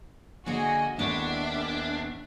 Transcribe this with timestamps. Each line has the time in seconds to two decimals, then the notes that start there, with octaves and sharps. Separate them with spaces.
0.46 D3 A#3 F#4 G#4 D#5 G#5
0.99 D#2 D3 G#3 B3 D4 E4 E5 C#6
1.46 C2 A2 C#4